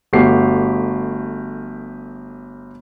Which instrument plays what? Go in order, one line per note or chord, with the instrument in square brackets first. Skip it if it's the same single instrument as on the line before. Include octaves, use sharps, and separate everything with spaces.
[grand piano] G1 A3 F#4 G4 C7